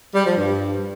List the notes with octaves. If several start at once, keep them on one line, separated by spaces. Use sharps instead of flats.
G3
F3
G2